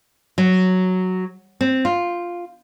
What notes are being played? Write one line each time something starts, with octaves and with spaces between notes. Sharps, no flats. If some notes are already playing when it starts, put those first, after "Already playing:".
F#3
C4
F4